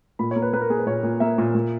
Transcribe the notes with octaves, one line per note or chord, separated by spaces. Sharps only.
A#2 B5
C#5
A#3
B4
A#3 B4
A#4
A#3 G#4
B4
A#2 C#5
A#2
A#3 E5
A#2
A#2